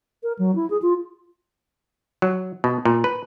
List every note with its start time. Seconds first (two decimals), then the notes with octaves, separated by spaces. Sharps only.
0.23 A#4
0.39 F#3
0.55 E4
0.70 G#4
0.82 F4
2.22 F#3
2.64 B2
2.85 A#2
3.04 B4